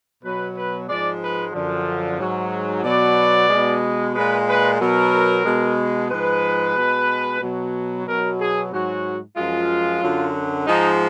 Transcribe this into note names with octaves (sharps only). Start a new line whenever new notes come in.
B2 F#3 B4
B4
G#2 F3 G#3 D5
B4
F#2 D3 F3
G#2 F#3
B2 F#3 D5
B2 G#3
A#2 G#3 B4
B4
B2 F#3 A#4
B2 G#3
G#2 F3 G#3 B4
B2 G#3
B2 F#3
B2 F#3 A#4
G#4
G#2 F#3 F#4
F#2 F3 G#3 F4
F#2 D3 F#3
G#2 F3 G#3 D#4